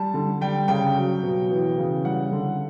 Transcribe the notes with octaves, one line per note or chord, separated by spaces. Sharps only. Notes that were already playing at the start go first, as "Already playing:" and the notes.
Already playing: G3 A5
D3
G3 G5
C#3 G5
F#3
B2
E3
C#3
G3 F#5
D3